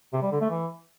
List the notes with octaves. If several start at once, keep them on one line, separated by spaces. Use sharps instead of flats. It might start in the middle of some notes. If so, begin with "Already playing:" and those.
C3
G3
D3
A3
E3